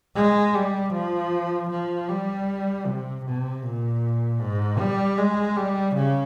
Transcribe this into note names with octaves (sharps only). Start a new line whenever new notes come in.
G#3
G3
F3
F3
G3
C3
C3
A#2
G#2
G3
G#3
G3
C#3